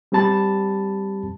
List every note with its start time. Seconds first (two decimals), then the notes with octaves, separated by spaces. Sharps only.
0.12 G3 C4 G4 A5 B5 A6